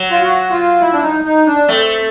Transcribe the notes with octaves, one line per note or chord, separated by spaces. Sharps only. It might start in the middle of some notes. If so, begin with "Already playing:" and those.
Already playing: F#3
F4
F#4
F4
E4
D4
D#4
D#4
D4
A3 C4